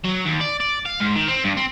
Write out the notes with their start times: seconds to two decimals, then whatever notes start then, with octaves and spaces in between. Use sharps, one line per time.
0.05 F#3
0.26 D#2
0.41 D5
0.60 D5
0.86 F5
1.00 G#2
1.15 D#3
1.28 C4
1.44 G2
1.57 C4